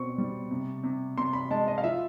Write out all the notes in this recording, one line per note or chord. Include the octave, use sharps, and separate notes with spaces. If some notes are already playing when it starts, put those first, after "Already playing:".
Already playing: B2 C4 C#6
G3
C3
C3
C3 C6
B5
G#3 A5
D#5
F5
F3 E5